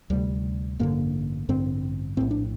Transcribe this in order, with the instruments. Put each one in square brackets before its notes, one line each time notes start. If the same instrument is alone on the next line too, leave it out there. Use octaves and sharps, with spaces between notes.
[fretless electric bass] D2 C3 G3
A1 G2 D3 A#3
A1 G2 D3 C4
A#1 A2 C4
D4